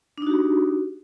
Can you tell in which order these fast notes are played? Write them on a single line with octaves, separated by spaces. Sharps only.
D4 D#4 F#4 G4